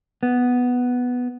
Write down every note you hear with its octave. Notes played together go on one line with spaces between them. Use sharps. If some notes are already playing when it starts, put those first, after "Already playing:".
B3